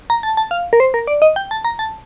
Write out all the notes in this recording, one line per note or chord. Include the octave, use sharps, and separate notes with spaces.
A#5
A5
A5
F5
A#4
C5
A#4
D5
D#5
G5
A5
A#5
A5